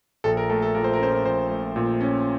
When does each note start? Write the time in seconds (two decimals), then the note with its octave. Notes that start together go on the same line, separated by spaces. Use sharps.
0.24 A#1 A4
0.37 A#4
0.49 A3 A4
0.62 A4
0.74 A#2 A#4
0.84 C5
0.94 A#4
0.99 C#4 C5
1.12 A#4
1.25 A#1 C5
1.50 A3
1.76 A#2
2.01 C#4